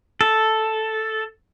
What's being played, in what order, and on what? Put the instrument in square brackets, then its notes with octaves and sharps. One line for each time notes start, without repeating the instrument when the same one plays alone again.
[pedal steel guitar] A4